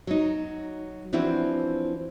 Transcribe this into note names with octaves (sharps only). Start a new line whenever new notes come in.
F#3 D#4
E3 F3 C4 D4 E4 F#4